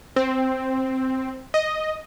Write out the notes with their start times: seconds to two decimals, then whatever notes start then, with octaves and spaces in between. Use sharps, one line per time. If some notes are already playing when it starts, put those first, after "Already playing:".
0.16 C4
1.54 D#5